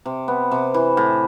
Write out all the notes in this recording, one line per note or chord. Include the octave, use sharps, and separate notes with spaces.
C3
B3
C3
E3
A2